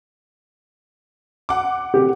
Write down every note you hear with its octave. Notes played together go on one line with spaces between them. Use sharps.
F#5 D6
G4